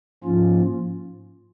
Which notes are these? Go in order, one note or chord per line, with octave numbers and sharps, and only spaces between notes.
G#2 F3 A#3 C#4 F4